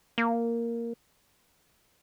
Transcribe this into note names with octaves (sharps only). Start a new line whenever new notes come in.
A#3